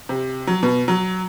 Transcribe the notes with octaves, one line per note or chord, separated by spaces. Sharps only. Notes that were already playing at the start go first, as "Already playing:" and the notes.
C3
F#3
B2
F#3